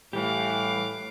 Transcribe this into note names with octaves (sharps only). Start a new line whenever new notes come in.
A2 E3 G3 G4 F5 D6